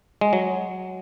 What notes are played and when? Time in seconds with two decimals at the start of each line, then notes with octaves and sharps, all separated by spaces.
0.21 G#3
0.33 F#3